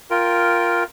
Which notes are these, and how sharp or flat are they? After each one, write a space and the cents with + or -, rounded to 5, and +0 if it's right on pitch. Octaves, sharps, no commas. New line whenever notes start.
F4 +0 A#4 +0 G5 +0